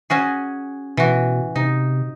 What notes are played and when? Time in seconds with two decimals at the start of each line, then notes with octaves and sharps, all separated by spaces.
0.10 C#4 F#4 G#4
0.97 B2 E3 F#4
1.56 C3 D#4